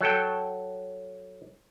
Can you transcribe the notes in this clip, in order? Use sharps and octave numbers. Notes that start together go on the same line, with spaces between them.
F#3 A4 G5